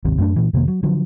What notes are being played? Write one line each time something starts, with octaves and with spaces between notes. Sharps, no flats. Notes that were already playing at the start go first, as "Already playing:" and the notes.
G#1 D#2 C3
F#2 A3 D4
A#2 E3
F2 C3 D#3 A#3
F#3
D3 F3 F#3